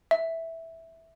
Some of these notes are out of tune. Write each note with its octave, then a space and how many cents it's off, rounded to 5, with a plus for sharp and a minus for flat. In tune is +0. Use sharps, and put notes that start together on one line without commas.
E5 -5